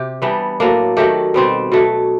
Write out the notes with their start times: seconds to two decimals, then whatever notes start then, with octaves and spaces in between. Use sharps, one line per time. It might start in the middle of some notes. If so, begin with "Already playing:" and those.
Already playing: C3 G4
0.22 E3 G3 B3 D4
0.60 A2 F#3 A#3 D4
0.97 D#3 F#3 A3 G4
1.34 B2 G3 C4
1.72 B2 F#3 A3